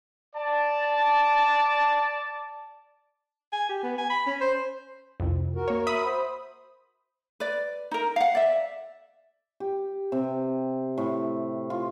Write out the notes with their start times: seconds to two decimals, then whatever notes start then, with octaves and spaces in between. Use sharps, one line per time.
0.35 D5 A5
3.52 G#5
3.69 G4
3.83 B3
3.98 G#5
4.10 B5
4.27 C#4
4.41 C5
5.20 C2 F2
5.56 F#4 A#4
5.68 A#3 C#5
5.87 E5 B5 D#6
6.05 C5
7.40 B4 D5
7.91 D#4 A#4
8.16 F5 F#5
8.35 D5 E5
9.60 G4
10.12 C3
10.98 A2
11.70 F4